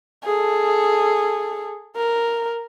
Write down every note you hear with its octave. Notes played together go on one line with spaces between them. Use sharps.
G#4 A4
A#4